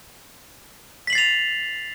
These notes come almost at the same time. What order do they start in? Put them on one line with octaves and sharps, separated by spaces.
B6 F#7 C7 A6 F7